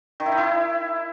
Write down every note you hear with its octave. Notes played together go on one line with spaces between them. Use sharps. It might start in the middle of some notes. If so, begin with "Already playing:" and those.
D#3
E4
D#4
E4